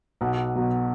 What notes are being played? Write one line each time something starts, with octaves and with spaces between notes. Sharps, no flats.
B1 F#5
B2 F#3 B3